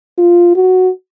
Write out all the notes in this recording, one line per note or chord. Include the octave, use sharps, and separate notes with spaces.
F4
F#4